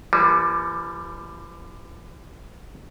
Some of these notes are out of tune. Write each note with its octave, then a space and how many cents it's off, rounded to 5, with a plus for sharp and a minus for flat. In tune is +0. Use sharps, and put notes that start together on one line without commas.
E3 +45 G3 +0 A#3 +25